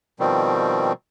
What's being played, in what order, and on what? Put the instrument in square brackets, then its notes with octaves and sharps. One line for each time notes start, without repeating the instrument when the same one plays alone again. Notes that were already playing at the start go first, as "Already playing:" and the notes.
[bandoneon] B2 D#3 F3 G3 C4